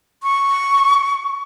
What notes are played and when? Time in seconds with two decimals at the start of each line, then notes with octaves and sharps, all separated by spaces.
0.23 C#6